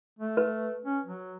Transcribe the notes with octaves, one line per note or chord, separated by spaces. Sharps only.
A3
B4
C#4
F#3